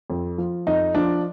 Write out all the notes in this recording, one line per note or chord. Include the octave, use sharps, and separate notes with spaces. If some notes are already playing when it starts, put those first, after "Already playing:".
F2
F3
F2 D#4
F3 D4